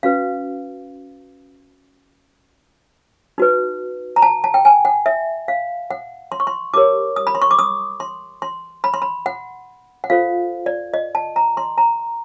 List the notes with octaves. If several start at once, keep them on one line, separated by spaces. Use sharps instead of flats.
C#4 F#4 B4 F5
D#4 F#4 B4
A#5
A5
A5
G5
G#5
F#5
E5
F5
F#5
C6
C#6
C6
E4 G4 A#4 C#5 D6
D#6
B5
C6
C#6
D6
D#6
C6
C6
B5
C6
B5
F#5
F#5
F4 A4 C5 F5
D5
D#5
A5
A#5
C6
A#5